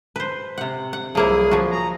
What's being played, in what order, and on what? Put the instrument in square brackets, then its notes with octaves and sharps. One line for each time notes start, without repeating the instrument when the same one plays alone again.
[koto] B4 C5
C3 F#5
F#5
[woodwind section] C2 F#3 G#4 [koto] F3 A#3 E4
[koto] F3 F#4
[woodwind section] G#4 A#5